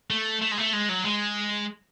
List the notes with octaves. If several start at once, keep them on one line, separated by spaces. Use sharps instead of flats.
A3
A3
G#3
A3
G#3
F#3
G#3